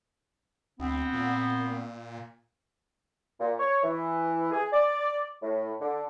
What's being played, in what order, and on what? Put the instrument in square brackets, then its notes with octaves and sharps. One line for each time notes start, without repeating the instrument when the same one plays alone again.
[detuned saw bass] D2 [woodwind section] B3 C4
[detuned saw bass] A#2
[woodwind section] A#2
C#5
E3
G#4
D5
A2
D3